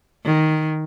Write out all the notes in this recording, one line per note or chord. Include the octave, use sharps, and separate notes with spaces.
D#3